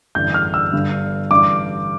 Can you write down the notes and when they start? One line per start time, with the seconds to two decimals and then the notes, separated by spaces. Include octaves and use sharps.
0.15 A1 G2 D3 G6
0.34 F6
0.54 E6
0.73 G1 G2 D3
1.31 A1 G2 D3 D6